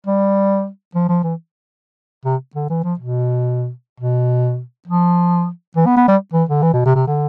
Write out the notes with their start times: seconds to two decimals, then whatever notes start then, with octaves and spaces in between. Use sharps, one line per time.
0.07 G3
0.95 F3
1.09 F3
1.23 E3
2.25 C3
2.55 D3
2.70 E3
2.84 F3
2.99 B2
4.00 B2
4.87 F3
5.76 E3
5.86 B3
5.97 B3
6.08 G3
6.33 E3
6.49 D3
6.62 E3
6.73 B2
6.85 C3
6.95 C3
7.07 D3